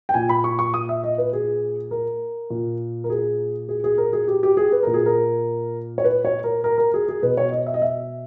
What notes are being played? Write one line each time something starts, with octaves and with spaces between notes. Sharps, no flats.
G5
A#2 G#5
B5
C#6
C#6
D#6
E5
D#5
B4
G#4
A#4
A#2
A#4
G#4
G#4
G#4
A#4
G#4
G4
G4
G#4
B4
A#2 A#4
G#4
A#4
C#5
B4
C#5
A#4
A#4
A#4
G#4
G#4
B2 B4
C#5
D#5
E5
D#5
E5